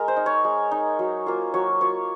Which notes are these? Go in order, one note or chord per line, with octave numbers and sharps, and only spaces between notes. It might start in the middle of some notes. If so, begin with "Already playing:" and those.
Already playing: G#3 A#4
C5
D#4
C#5
G#3
D#4
F#3
A#3 F4
F#3 C#5
A#3 F4 C#5